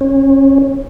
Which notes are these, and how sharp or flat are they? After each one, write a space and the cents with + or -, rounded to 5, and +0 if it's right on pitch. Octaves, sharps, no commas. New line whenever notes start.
C#4 -30